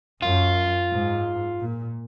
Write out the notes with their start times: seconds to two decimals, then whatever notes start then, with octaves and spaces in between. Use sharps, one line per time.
0.22 F#2 F4
0.90 G#2
1.59 A#2